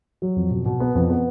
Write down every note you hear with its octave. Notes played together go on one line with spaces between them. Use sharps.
F#3
F2
B2
B2
B3
F2
B3